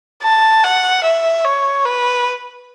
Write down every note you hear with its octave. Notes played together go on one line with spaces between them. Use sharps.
A5
F#5
E5
C#5
B4